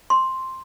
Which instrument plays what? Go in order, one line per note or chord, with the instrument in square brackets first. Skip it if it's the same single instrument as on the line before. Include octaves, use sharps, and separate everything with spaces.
[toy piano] C6